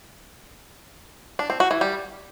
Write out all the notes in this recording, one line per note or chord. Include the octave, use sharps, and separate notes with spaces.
D4
C4
F#4
E3
G3